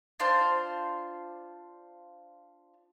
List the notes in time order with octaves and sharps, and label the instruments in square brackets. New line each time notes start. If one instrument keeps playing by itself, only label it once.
[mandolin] D4 F4 C5